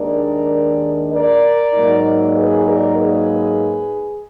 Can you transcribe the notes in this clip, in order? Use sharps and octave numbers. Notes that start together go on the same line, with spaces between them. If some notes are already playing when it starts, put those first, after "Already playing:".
Already playing: D#2 D#3 G#3 D4 A#4 D5
A#4 D5
G#2 F#3 A#3 D#4
G#4 B4
A#4 D5
G#4 B4